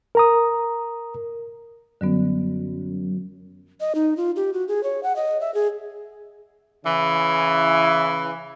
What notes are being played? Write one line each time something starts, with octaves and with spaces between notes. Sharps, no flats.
A#4 A#5 D#6
F#2 D3 G3 B3
D#5
D#4
F4
G4
F#4
G#4
C#5
F#5
D#5
E5
G#4
C#3 E3